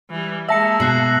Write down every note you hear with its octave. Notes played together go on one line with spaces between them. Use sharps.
E3 G3
G#3 A#3 E5 A5 E6 A#6 C#7
B2 F#6 C7 F#7